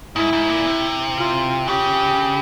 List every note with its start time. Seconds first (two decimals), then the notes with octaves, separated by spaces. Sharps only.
0.16 G#2 E4
0.33 G#2
0.49 A#2
0.67 C3
1.17 F4
1.67 C#3 G4